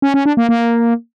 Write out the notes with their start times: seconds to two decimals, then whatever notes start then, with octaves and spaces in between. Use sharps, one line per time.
0.02 C#4
0.14 C#4
0.26 D4
0.37 A#3
0.49 A#3